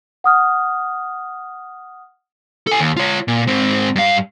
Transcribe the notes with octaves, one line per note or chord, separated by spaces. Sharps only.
F#5 D#6 F6
A4 G#5
D#2
F4 C#5
A#2
G#2 C4
G2 F5